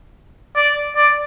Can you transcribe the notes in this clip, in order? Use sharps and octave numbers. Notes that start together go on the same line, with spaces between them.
D5
D5